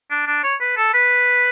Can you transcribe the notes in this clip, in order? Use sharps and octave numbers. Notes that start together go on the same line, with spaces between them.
D4
D4
C#5
B4
A4
B4